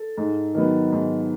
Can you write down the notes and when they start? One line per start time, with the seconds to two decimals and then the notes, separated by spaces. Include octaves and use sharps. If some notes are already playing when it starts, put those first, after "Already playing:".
Already playing: A4
0.18 G#2
0.55 D#3 F#3 B3
0.92 G#2